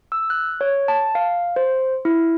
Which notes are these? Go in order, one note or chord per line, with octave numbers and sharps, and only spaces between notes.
E6
F#6
C#5
A5
F5
C5
E4